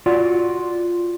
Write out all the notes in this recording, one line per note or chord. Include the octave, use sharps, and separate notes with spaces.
F4 F#4 D5 F#5